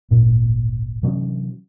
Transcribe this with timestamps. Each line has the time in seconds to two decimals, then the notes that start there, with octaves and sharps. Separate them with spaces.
0.11 D1 G#1 A#2
1.03 C3 E3 F#3 C#4